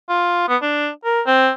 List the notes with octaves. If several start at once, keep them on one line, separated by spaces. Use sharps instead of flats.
F4
B3
D4
A#4
C4